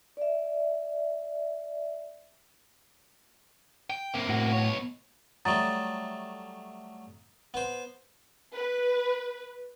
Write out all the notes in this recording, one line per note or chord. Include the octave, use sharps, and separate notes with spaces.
D5 E5
G5
C3 A#3
A2 F#4
B2 C#5
F#3 G3 A3 A#5 D#6 A6
B3 C5
B4